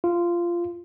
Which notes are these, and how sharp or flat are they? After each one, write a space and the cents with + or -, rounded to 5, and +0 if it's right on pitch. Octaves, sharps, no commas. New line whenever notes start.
F4 -15